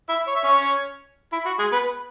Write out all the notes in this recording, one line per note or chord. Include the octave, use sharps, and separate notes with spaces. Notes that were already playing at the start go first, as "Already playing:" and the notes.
E4 E5
C#5
E5
C#4 C#5
E4
F#4
G#3 G#4
B3 B4